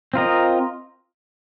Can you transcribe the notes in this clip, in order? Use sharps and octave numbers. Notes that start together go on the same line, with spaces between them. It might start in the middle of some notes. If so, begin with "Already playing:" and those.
C4 F4 A#4 D#5